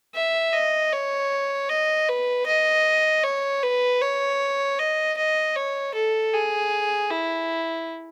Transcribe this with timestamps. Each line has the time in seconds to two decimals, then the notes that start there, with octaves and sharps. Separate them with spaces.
0.15 E5
0.53 D#5
0.93 C#5
1.69 D#5
2.09 B4
2.47 D#5
3.23 C#5
3.63 B4
4.01 C#5
4.79 D#5
5.17 D#5
5.56 C#5
5.94 A4
6.34 G#4
7.11 E4